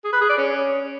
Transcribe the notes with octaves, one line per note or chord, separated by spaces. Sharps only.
G#4
B4
G#4
D5
C#4